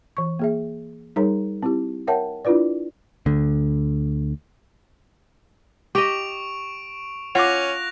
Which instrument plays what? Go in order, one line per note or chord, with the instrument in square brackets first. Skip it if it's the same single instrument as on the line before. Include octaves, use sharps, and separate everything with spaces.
[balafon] E3 C#6
A#3 G#4 E5
G3 D#4 G#4 A#4 C#5 A#5
C4 E4 G4
A#4 C#5 E5 F#5 G5 A5
D4 E4 F4 B4 D5
[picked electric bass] D2 D3
[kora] G4 D#5 [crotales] C#6 D7 F7
[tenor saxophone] C#4 [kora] F4 [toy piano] F#5 D6 [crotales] F#6 A#6 F7